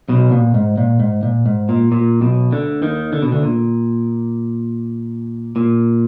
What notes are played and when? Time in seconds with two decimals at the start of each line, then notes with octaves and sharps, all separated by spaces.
0.09 B1 B2
0.32 A#2
0.54 G#2
0.78 A#2
1.00 G#2
1.23 A#2
1.46 G#2
1.69 A#2
1.92 A#2
2.21 B1 B2
2.51 D2 D3
2.82 D#2 D#3
3.13 D3
3.22 B2
3.32 D2 D3
3.43 A#2
5.56 A#2